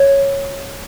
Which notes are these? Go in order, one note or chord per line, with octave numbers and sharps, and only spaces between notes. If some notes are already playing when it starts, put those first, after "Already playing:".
Already playing: C#5